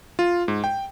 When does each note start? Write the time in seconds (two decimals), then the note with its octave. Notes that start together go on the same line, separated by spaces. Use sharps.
0.19 F4
0.48 G#2
0.64 G5